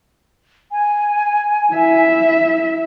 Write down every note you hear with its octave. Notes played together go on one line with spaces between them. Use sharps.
G#5
E4 E5